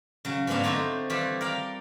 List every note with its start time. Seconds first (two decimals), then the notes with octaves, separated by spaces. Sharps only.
0.25 C#3 F#3
0.47 G#2 E3 F#3 B3 D4 F5
0.64 D3 A3 C4 D#4 C5
1.10 E3 G3 F4 G4
1.41 A#4 D5 F5 G5